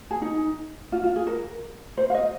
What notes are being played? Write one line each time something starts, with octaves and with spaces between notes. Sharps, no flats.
G#4
D#4
F4
F4
G#4
A#4
C5
F5
D#5